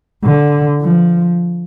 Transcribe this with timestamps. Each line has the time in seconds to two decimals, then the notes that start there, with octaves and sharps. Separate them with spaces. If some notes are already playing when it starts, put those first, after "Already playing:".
0.24 D3
0.82 F3